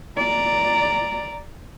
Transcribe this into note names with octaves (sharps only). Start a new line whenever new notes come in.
D5 A#5